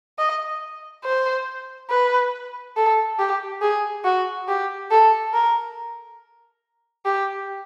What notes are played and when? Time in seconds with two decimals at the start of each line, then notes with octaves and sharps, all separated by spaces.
0.18 D#5
1.04 C5
1.90 B4
2.76 A4
3.19 G4
3.62 G#4
4.04 F#4
4.48 G4
4.91 A4
5.33 A#4
7.05 G4